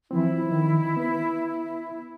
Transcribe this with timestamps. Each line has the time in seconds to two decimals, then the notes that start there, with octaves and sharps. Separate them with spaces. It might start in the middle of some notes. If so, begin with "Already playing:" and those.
0.11 E3 F3 C4 E4
0.51 D#3
0.97 B3 B4